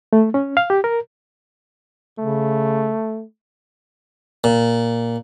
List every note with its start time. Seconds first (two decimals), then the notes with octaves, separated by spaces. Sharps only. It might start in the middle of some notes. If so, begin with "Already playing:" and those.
0.13 A3
0.34 C#4
0.57 F5
0.70 G4
0.84 A#4
2.19 C#3 A3
4.44 A#2